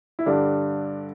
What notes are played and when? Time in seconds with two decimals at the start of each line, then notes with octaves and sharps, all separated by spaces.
0.19 E4
0.26 G2 D3 G3 D4